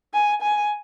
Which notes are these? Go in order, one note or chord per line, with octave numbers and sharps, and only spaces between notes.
G#5
G#5